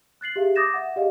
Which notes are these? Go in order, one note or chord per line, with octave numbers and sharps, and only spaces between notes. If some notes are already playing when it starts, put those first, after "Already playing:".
F#6 A6 C7 F#7
G4 G#4 E5 F5
D6 D#6 G6 A6 A#6 E7
E5 F#5
G4 G#4 D5 D#5 F5